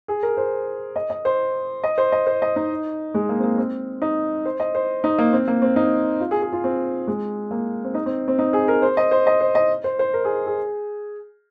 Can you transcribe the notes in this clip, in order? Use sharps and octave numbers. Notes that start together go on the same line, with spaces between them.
G#4
A#4
C5
D#5
D#5
C5
D#5
C5
D#5
C5
D#5
D#4
G#3
A#3
C4
A#3
C4
D#4
C5
D#5
C5
D#4
A#3
C4
A#3
C4
D#4
F4
G#4
G#4
F4
C4
G#3
A#3
C4
D#4
C4
C4
D#4
G#4
A#4
C5
D#5
C5
D#5
C5
D#5
C5
C5
A#4
G#4
G#4